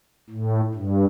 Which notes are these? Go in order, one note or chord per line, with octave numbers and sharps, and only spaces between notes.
A2
G2